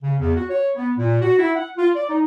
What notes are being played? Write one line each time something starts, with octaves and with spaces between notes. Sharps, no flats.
C#3
E2
F#4
C#5
B3
A#2
F#4
E4
F#5
F4
D5
D#4